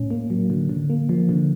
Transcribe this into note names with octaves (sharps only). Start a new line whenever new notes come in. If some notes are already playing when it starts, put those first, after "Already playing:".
Already playing: A2 C#4
A#3
F#3
D3
D3
A#3
F3
D3